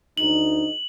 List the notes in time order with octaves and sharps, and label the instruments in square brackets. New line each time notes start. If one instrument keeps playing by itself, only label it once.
[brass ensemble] D2 D#4 [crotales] F#7